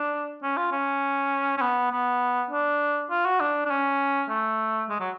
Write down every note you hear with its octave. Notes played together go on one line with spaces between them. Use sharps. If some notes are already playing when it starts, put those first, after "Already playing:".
Already playing: D4
C#4
F4
C#4
C#4
B3
B3
D4
F4
F#4
D4
D4
C#4
A3
G#3
F#3